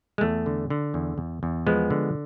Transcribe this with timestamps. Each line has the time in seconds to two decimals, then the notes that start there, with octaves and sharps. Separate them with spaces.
0.18 G#3
0.21 E2 A3
0.46 D3
0.70 D3
0.94 E2
1.18 E2
1.43 E2
1.67 F3 G#3 B3
1.90 D3